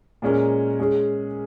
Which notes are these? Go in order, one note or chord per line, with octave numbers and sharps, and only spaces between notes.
A#2 G#3 C#4 A#4
G#3 C#4 G#4